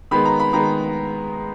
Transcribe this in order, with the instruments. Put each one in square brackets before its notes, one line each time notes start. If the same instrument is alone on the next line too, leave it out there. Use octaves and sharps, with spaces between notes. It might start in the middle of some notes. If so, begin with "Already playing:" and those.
[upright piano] D#3 G#3 B3 B5
A#5
B5
D#3 G#3 B3 A#5